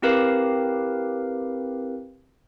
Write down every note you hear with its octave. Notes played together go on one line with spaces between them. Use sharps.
C4 E4 G4 A#4 B4 F5